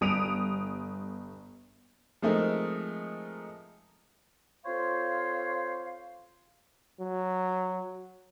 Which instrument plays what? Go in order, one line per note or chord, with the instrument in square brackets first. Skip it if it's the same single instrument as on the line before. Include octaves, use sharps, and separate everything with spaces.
[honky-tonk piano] G1 D#6 D7 F7
[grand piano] F3 G#3 A3 C4 D#4 A#4
[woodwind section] C4 F4 A4 C5 C#5 F5
[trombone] F#3